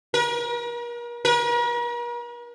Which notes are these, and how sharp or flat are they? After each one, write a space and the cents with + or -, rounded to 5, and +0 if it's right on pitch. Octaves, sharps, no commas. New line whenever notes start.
A#4 +40
A#4 +45